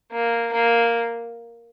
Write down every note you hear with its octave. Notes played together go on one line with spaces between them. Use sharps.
A#3
A#3